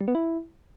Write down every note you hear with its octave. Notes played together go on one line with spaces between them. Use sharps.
G3
B3
E4